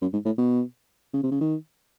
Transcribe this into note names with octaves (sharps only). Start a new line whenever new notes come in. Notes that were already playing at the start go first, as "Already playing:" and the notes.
F#2
G#2
A2
B2
C#3
C3
C#3
D#3